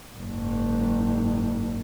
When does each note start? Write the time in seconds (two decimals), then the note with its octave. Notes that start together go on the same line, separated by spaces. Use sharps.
0.17 F#1 G#2